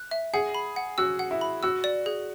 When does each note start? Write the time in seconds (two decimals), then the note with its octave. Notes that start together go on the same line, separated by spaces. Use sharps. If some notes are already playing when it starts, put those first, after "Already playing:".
Already playing: F#6
0.11 E5
0.34 G#4 F#5
0.54 B5
0.76 F#5
0.98 F#4 E6
1.19 F#5
1.31 E4
1.41 B5
1.63 F#4 E6
1.84 D5
2.06 G#4